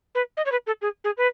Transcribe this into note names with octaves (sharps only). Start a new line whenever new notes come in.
B4
D#5
C#5
B4
A4
G#4
G#4
B4